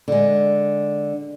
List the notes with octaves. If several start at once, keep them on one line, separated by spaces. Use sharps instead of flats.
D3 G#3